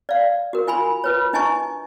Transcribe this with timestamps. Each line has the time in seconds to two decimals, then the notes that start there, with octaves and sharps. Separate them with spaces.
0.09 D5 F5
0.53 F#4 A#4
0.67 F4 G#5 B5 C6
1.04 F4 B4 C#5
1.33 D4 E4 D#5 G#5 A5 C#6